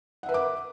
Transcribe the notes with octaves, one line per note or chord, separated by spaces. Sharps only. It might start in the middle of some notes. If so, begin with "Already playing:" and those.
A#4 B4 E5 F#5 D6